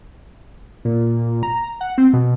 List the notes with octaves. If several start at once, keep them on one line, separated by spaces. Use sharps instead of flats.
A#2
A#5
F#5
C4
B2